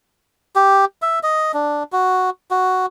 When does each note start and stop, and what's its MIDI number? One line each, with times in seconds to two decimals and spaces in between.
0.56 0.85 67
1.02 1.19 76
1.23 1.52 75
1.54 1.83 62
1.92 2.30 66
2.51 2.86 66